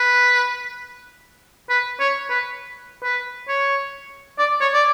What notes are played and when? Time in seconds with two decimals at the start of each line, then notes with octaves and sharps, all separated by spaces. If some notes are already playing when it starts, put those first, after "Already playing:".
Already playing: B4
1.69 B4
2.00 C#5
2.30 B4
3.03 B4
3.48 C#5
4.38 D5
4.60 C#5
4.73 D5